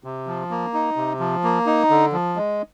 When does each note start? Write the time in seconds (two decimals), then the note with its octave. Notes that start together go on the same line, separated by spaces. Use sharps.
0.04 C3
0.27 F3
0.51 A#3
0.74 D#4
0.96 C3
1.20 F3
1.44 A#3
1.66 D#4
1.90 D3
2.12 F3
2.36 G#3